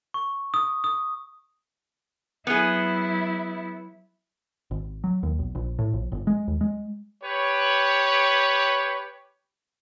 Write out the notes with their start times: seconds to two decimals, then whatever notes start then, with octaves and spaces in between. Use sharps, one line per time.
0.14 C#6
0.54 D#6
0.84 D#6
2.47 F#3 B3 E4 G#4
4.71 G#1
5.04 F#3
5.23 D#2
5.39 B1
5.55 A#1
5.79 A2
5.94 A#1
6.12 G1
6.27 G#3
6.48 D#2
6.61 G#3
7.24 G4 B4 C#5